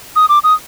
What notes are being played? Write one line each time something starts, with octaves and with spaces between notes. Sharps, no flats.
D#6
D6
D#6